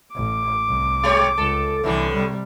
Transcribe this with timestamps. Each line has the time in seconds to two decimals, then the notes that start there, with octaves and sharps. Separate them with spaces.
0.16 A1 D6
0.67 C2
1.03 G#3 G4 C#5
1.38 C#2 A4
1.83 C2 A2 D3 E3
2.14 C3 G3